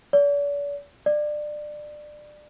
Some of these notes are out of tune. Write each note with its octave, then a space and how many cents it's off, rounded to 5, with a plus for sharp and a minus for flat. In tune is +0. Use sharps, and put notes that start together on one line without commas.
D5 -40
D5 +25